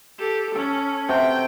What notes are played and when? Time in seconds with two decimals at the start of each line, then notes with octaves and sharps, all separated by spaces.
0.19 G4 A4
0.55 C#4 A4
1.09 C3 F#4 G5